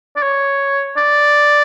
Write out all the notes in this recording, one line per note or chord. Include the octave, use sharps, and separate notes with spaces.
D5
C#5
D5